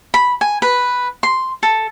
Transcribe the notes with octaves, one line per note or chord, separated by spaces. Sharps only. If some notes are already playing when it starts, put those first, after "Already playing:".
B5
G#5
B4
C6
A4